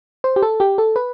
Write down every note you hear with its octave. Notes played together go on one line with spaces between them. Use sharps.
C5
G4
A4
G4
A4
B4